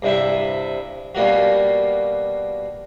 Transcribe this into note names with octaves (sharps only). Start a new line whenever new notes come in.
G2 C3 E4 E5
B2 G3 A#3 F4 F#4